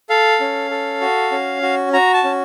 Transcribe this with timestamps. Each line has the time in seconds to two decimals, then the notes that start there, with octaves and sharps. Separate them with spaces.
0.10 A4 F5
0.40 C#4
0.71 A4
1.01 F#4
1.32 C#4
1.62 F#4
1.93 F#4 A#5
2.13 A5
2.24 C#4